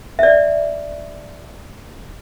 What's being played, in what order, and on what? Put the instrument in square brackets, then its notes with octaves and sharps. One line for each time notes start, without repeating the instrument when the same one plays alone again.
[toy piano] D5 E5